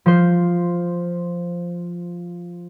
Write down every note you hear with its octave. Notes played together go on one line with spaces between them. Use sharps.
F3 C5